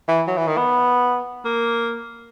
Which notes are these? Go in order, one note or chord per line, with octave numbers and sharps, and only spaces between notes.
E3
F#3
E3
D#3
B3
A#3